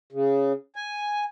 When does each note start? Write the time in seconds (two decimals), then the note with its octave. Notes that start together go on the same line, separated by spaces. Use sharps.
0.12 C#3
0.76 G#5